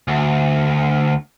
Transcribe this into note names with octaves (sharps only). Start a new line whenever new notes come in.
D2